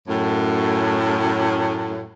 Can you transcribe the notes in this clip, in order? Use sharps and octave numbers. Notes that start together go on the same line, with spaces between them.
F#2 A2